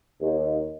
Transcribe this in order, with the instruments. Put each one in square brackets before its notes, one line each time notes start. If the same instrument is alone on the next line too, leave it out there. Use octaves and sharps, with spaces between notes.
[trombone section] D#2